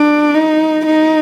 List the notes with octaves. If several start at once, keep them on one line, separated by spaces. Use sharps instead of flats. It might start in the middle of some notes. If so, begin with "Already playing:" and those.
Already playing: D4
D#4
D#4